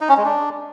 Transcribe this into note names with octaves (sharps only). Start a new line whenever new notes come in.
D#4
C#4
G#3
D4